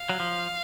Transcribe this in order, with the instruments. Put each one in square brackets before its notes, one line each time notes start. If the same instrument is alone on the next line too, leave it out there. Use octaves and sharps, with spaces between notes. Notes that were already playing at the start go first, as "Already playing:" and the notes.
Already playing: [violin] F5
[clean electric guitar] F#3
F3